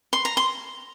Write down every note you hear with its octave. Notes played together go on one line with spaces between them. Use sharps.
C6
A#5
C6